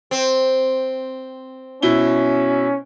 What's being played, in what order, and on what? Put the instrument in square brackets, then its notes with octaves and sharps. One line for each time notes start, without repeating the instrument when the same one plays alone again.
[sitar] C4
[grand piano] B2 E4 G7 [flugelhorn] C#4